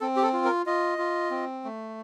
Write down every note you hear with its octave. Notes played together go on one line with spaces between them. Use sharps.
C4 A4
G4
A4
F4
A#4
F4 D#5
F4
C4
A3